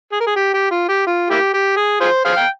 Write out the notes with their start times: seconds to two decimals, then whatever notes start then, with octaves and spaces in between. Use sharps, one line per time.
0.12 G#4
0.20 A#4
0.27 G#4
0.36 G4
0.54 G4
0.71 F4
0.89 G4
1.07 F4
1.30 A#3 E4 G4
1.54 G4
1.77 G#4
2.01 F4 G#4 C5
2.25 G#4 C5 F5
2.36 G5